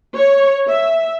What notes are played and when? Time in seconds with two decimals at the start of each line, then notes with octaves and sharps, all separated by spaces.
0.15 C#5
0.69 E5